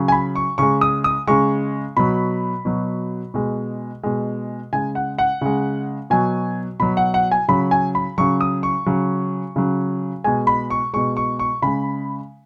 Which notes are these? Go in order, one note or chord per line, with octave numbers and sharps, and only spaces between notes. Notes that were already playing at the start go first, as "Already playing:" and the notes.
Already playing: C#3 F#3
G#5
B5
C#6
C#3 G#3 C#6
D#6
D#6
C#3 G#3 C#6
B2 F#3 B5
B2 F#3
B2 G#3
B2 G#3
C#3 G#3 G#5
F#5
F#5
C#3 G#3
B2 F#3 G#5
B2 F#3 B5
F#5
F#5
G#5
C#3 F#3 B5
G#5
B5
C#3 F#3 C#6
D#6
C#6
C#3 F#3
C#3 F#3
B2 G#3 G#5
B5
C#6
B2 G#3 C#6
C#6
C#6
C#3 G#3 B5